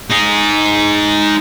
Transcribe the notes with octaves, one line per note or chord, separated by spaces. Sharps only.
D#4 G#4